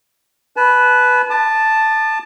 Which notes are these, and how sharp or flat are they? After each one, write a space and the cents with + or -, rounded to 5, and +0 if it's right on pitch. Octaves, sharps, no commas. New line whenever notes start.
B4 +0 A5 -35
A5 +0 D6 +45